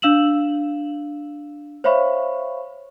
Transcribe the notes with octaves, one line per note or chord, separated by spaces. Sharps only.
D4 F5 E6 E7 F#7
C5 C#5 E5 F5 B5 C#6